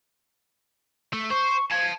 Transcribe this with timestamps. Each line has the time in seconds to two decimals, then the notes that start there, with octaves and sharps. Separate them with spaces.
1.13 A3
1.30 C5 C#6
1.71 F5 A5 G#6